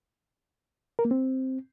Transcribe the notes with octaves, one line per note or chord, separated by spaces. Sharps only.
A#4
A#3
C4